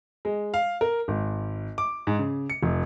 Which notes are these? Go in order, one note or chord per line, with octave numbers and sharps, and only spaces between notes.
G#3
F5
A#4
G#1
D6
G#2
C#3
C#7
F1